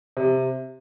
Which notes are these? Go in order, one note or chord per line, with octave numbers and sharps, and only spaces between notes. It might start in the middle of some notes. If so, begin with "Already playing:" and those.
C3